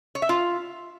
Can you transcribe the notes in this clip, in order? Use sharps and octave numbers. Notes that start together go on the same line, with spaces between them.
C#5
E5
F4